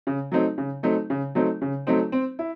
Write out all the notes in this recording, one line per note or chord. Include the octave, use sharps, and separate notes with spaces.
C#3
F#3 A3 C4 D#4
C#3
F#3 A3 C4 D#4
C#3
F#3 A3 C4 D#4
C#3
F#3 A3 C4 D#4
C4
E4